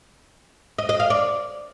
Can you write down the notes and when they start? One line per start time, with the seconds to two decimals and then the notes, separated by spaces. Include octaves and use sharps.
0.79 D#5
0.89 D#5
1.00 F5
1.10 D5